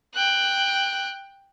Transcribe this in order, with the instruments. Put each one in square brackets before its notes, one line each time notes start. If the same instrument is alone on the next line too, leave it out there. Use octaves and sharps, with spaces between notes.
[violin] G5 F#6